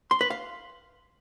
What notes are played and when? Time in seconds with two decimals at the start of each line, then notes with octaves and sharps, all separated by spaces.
0.11 C6
0.21 B4
0.30 F5